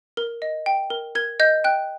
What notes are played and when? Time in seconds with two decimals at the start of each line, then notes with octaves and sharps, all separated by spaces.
0.17 A#4
0.42 D#5
0.66 G5
0.90 A#4
1.15 A#4 G#6
1.40 D#5 G6
1.64 G5 F#6